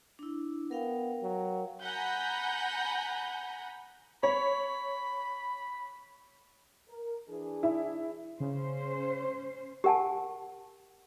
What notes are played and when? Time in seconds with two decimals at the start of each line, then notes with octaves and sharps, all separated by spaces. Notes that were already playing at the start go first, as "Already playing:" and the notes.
0.19 D4 E4
0.71 B3 A#4 F5 G5
1.23 F#3
1.83 F#5 G#5 A#5 B5 G6
4.23 C#5 B5
6.89 A#4
7.29 E3 D4 G#4
7.63 E4
8.40 C#3 C#4 C5
9.84 G4 A#4 F#5 G#5 A5